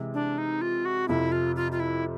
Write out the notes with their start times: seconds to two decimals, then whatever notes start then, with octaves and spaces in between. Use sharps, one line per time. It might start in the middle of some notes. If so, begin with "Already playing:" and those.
Already playing: C3 E3 G#3
0.14 D4
0.38 D#4
0.61 F4
0.85 F#4
1.08 F2 C3 F3 E4
1.32 F4
1.56 F4
1.72 F4
1.80 E4